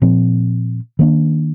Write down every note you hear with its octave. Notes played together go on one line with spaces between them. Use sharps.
A#2 F3 C4
D#3 A#3 D4